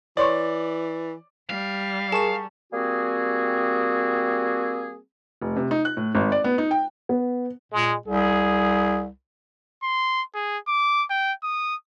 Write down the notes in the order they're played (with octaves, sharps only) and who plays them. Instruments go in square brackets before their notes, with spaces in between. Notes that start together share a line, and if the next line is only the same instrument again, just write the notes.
[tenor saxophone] E3 [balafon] C#5 C6 C#6 [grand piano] D5
[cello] G3 [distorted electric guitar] F5
[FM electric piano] G#4 A#4 C#6 [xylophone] A5 E7
[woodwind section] G3 A#3 C4 F#4 G#4
[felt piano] F1
C3
D#4
F#6
A2
G#1
D5
B3
D#4
G5
[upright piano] B3
[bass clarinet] A#2 [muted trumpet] G#3
[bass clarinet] C2 [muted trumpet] G#4
[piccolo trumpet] C6
G#4
D6
G5
D#6